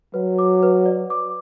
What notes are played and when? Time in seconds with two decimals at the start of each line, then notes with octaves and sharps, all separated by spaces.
0.14 F#3 B4
0.39 D6
0.63 B4
0.86 D5
1.10 D6